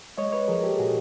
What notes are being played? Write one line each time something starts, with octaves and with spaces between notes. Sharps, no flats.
G#3 C#5 D#5
B4 C#5
F3 G#4 A#4
G4 A4
A#2 F#4 G#4